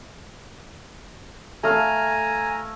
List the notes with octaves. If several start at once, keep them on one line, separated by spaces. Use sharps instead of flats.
A3 F5 G#5 A#5